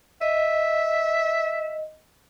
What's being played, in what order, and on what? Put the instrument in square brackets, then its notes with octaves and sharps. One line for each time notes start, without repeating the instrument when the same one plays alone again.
[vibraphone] D#5 [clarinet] E5